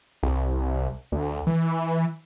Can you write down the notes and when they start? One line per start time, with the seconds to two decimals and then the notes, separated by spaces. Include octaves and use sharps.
0.23 C2
1.12 D2
1.47 E3